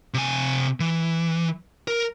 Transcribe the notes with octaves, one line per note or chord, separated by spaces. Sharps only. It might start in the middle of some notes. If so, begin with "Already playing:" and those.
C3 G#5
E3
A#4